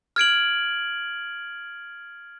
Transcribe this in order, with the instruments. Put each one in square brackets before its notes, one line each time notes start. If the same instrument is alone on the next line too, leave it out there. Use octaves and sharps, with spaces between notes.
[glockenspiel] F6 G#6 D7 F#7